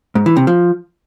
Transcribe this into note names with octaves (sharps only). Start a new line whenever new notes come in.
G#2
E3
C3
F3